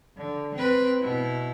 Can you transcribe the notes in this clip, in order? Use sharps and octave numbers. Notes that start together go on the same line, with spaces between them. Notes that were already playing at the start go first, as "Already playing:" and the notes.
D3
C4 B4
B2 E4